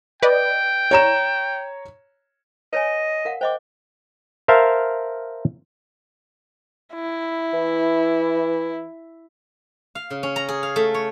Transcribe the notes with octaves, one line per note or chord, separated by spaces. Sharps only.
B4 D5 D#5 G5
C#5 A#5 E7
B4 C#5 D#5 G#5
A#4 F5 F#5
C5 D#5 G5 D6
A#4 C5 E5 F5 A5
E4
E3
F5
C#3
C#4
A#5
G#4
F5
A3
C#5